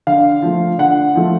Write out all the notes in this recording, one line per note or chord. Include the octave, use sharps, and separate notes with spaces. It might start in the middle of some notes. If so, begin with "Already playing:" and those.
D3 F5
F3 A3
D3 F#5
F3 A3